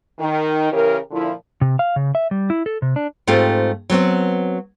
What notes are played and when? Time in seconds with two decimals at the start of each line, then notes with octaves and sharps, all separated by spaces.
0.19 D#3
0.71 C#3 E3 G4 A#4
1.11 A#2 D3 F3 E4
1.61 C3
1.79 F5
1.96 C#3
2.15 E5
2.31 G3
2.50 E4
2.66 A4
2.82 C3
2.96 D4
3.27 G#2 A3 C4 F4 G4
3.90 F#3 B3 C4 F#4